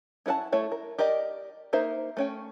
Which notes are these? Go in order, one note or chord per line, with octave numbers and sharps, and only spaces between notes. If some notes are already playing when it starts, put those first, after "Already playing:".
C#4 E4 A#4 F#5 A5
A3 E4 A4 C#5
A#4
G4 A#4 D5 D#5
A#3 D#4 A#4 C5 E5
A3 C#4 G5